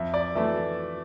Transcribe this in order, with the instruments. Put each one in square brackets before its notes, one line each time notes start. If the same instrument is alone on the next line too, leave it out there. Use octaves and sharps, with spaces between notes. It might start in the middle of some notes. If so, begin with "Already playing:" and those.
Already playing: [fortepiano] F2 [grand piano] E5
[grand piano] D5
[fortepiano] E3 A3 E4 [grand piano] E5